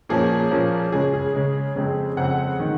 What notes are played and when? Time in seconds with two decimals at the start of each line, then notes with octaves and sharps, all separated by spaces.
0.09 A#2 F3 A#3 C#4 G#4
0.51 A#2 F3 A#3 C#4
0.92 C#3 G#3 C#4 G#4
1.14 G#4
1.33 C#3 G#3 C#4
1.75 F2 C#3 G#3 C4
2.17 F2 C#3 G#3 C4 F#5
2.60 D#3